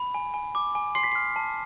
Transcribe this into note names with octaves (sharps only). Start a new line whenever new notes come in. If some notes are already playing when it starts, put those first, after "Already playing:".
Already playing: B5
G#5
G#5
D6
G#5
C6 C7
B6
F6 C7
A5